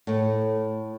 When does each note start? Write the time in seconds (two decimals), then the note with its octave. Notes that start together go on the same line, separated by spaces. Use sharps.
0.07 A2 A3